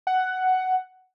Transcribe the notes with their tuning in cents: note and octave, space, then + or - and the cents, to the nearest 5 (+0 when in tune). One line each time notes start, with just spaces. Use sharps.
F#5 +10